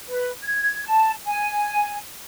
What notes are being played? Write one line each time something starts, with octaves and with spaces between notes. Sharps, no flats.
B4
G#6
A5
G#5